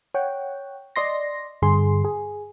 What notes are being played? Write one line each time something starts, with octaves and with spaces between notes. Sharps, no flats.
C#5 F#5 G5
D5 D#5 C6 A#6
G2 D3 G#4 C6
G#4